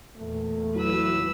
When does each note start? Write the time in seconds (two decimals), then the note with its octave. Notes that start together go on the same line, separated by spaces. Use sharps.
0.18 E2 A#2 A3
0.75 E3 F#3 B4 E6